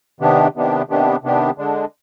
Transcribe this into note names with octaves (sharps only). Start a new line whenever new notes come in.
C3 D#3 B3 D4 G4
C3 D#3 B3 D4 G4
C3 D#3 B3 D4 G4
C3 D#3 B3 D4 G4
D3 G#3 D4